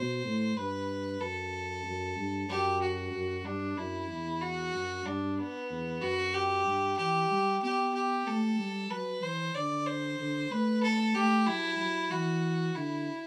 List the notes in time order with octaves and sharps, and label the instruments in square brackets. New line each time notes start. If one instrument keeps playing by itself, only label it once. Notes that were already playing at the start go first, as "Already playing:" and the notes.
Already playing: [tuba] B2 [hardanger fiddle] C5
[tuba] A2
[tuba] G2 [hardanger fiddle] B4
[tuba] F#2 [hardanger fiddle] A4
[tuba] F#2
G2
[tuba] F#2 [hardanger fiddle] G4
[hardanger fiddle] F#4
[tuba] F#2
[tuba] G2 [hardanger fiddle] D4
[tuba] F#2 [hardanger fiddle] E4
[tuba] E2
[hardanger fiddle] F#4
[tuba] F#2
[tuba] G2 [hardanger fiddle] D4
[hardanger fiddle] B3
[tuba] E2
[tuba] F#2 [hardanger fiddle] F#4
[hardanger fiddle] G4
[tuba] G2
[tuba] E3 [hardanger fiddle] G4
[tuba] G3
[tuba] B3 [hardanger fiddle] G4
[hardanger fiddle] G4
[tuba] A3 [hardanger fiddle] A4
[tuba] G3
[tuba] F#3 [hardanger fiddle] B4
[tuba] E3 [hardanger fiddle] C5
[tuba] D3 [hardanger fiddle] D5
[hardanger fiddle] C5
[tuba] D3
[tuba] A3 [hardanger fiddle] B4
[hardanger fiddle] A4
[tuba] A3 [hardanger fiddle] G4
[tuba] F#3 [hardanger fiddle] E4
[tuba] F#3
[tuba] E3 [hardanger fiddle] F#4
[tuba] D3 [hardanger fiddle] E4